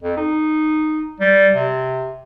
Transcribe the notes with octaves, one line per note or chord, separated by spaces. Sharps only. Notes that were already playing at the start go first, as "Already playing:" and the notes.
F2
D#4
G3
C3